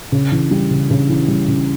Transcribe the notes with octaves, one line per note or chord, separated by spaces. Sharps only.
C#3
E3
G3
C#3
C#3
E3
G3
C#3